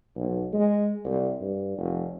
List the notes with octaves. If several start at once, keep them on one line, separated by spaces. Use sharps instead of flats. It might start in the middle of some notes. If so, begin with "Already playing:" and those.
B1
G#3
C2
G2
F1